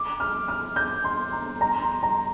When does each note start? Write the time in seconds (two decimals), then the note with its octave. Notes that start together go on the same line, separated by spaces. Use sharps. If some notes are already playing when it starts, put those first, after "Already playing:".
Already playing: D6
0.20 F6
0.48 F6
0.76 G6
1.04 C6
1.32 A#5
1.61 A#5
1.82 C6
2.03 A#5